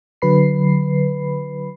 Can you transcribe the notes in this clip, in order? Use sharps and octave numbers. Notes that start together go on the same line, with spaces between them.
D3 F#3 B4 B5 C7